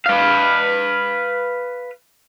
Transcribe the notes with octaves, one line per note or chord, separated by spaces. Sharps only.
B4 F5